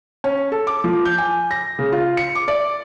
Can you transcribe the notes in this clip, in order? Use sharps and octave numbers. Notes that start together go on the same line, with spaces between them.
C#4
A4
D6
F3
G6
G#5
A#6
C#3
F4
C#7
D6
D5